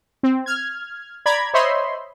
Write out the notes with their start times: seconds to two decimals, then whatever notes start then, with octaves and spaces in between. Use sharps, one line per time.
0.23 C4
0.46 F6 G#6
1.26 D5 A#5 B5 G#6
1.54 C5 C#5 D#5 E5 B5 C6